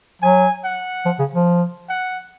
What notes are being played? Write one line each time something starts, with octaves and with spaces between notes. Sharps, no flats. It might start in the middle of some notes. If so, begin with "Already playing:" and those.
F#3 G#5
F#5
F3
C#3
F3
F#5